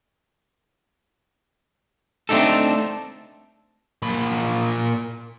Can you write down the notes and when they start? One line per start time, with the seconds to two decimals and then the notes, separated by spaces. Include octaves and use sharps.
2.29 A3 C4 D4 D#4 A4
4.03 A#2 B5